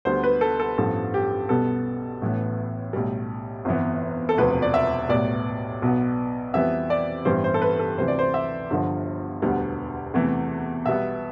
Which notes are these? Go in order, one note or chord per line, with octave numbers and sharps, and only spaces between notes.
D2 D3 G3 B3 C5
B4
A4
A4
A1 G2 F3 B3 A4
G4
B1 B2 G3 B3 A4
A1 A2 E3 B3
B1 A2 G3
G1 F2 E3 B3
A4
E1 D2 C3 F3 B4
D5
E5
B1 A2 G3 B3 D5
B1 B2 B3
F2 E3 G3 B3 E5
D5
A1 G2 E3 G3 B3 C5
C5
A4
B4
A4
D2 C3 E3 C5
D5
C5
E5
G1 G2 D3 F3
E1 D2 D3 G3 B3
E2 C3 E3 A3
B1 B2 G3 B3 E5